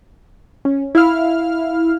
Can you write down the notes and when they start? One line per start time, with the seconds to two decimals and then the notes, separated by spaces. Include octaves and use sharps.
0.65 C#4
0.95 E4 F5 F6